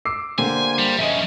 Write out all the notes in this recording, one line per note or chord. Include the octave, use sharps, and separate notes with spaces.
D6 E6 C7
D3 A#3 G4 C5 G#5
G3
F3 C#4 D#5 E5